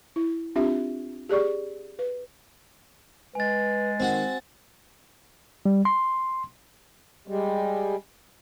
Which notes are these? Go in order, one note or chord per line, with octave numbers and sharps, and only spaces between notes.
E4
C4 D4 F4 G4 E5
G4 G#4 D5 C#6
B4
G#3 B4 G#5 A6
D#3 C4 F#4 F#5
G3
C6
G3 G#3